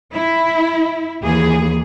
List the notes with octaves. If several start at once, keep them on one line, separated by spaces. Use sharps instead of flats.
E4
D#2 E3 G#4